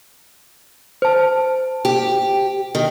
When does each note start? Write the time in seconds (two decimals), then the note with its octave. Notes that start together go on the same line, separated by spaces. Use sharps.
1.02 C5 A5
1.85 G4
2.75 D#3